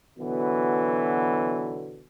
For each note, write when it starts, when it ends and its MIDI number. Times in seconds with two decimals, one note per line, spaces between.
0.19 2.03 47
0.19 2.03 50
0.19 2.03 52
0.19 2.03 54
0.19 2.03 59